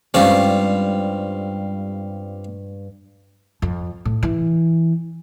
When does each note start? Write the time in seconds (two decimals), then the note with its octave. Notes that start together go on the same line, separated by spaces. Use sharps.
0.14 D2 G2 G3 G#3 C4 C#4 F4
3.62 F2
4.05 A2
4.23 E3